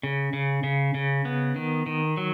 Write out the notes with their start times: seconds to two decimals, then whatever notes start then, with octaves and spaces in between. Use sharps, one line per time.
0.03 C#3
0.33 C#3
0.63 C#3
0.94 C#3
1.25 B3
1.56 D#3
1.86 D#3
2.17 F#3